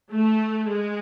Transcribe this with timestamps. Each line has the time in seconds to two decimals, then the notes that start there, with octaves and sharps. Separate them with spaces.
0.11 A3
0.68 G#3